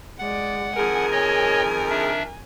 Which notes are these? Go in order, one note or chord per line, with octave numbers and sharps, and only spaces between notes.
G#3 D5 F#5
F2 D#3 G#4 A#4 G#5
C#5 D#5
D4 E5